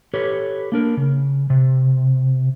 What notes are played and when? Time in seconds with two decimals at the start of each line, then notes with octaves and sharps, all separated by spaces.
0.14 G4 A4 B4 C#5
0.72 A#3 D4 A#4
0.97 C#3
1.50 C3